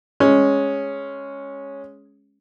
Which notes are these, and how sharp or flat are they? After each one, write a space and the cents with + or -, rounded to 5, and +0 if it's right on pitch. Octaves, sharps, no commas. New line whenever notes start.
G#3 +0 C#4 +0